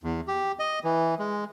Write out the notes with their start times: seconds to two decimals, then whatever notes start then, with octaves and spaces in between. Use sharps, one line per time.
0.04 E2
0.28 G4
0.59 D#5
0.84 E3
1.19 G#3